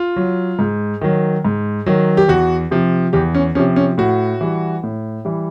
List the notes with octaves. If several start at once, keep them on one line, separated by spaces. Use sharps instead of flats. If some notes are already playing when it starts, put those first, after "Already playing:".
Already playing: F4
F#3
G#2
D#3 F#3
G#2
D#3 F#3
G4
E2 F#4
C3 F3
E2 G4
C#4
C3 F3 C#4
C#4
A2 F#4
E3 G3
A2
E3 G3